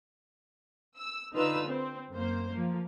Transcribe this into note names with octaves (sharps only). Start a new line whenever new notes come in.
E6
D3 D#4 F4 B4 E6
C4
F#2 A#3 C5
F3 A#3